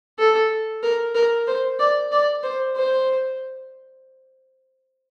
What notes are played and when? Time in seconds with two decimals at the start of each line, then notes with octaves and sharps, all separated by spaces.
0.19 A4
0.83 A#4
1.15 A#4
1.47 C5
1.79 D5
2.12 D5
2.43 C5
2.76 C5